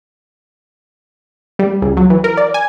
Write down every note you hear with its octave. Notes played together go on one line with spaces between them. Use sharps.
G3
C#2
F#3
E3
A#4
D5
G#5